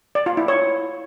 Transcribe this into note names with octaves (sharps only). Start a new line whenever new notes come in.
D5
F4
E4
C#5